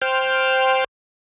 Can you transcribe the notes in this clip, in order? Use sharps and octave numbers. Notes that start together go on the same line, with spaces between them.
C5 G5 F6